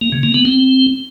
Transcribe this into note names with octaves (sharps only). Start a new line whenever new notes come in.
A#3
C#3
A#3
B3
C4